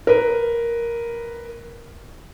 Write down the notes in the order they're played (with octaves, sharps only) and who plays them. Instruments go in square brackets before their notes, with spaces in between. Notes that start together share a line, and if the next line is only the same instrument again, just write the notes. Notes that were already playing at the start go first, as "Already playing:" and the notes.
[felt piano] A#4 B4